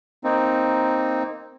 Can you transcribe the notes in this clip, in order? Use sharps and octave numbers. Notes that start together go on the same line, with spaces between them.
A#3 C4 D#4